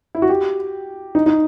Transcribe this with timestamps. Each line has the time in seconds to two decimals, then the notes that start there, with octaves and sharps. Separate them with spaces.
0.15 E4
0.22 F#4
0.29 G4
1.15 D#4
1.26 D#4